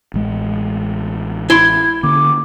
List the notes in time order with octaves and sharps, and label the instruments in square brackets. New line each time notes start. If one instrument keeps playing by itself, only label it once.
[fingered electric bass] A1 G#3
[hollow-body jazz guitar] E4 C6 [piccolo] G#6
[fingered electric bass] D3 A#3 C#4 [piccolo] D6